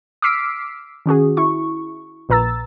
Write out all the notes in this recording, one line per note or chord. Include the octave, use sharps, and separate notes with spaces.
D6 E6 F6 B6 C7 D7
D#3 C#4 F#4 G#4
E4 C#6
A#1 A#2 B4 A#5 E6 A6